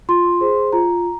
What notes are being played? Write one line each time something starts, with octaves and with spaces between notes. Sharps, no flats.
F4 C6
G#4 C5
F4 A#5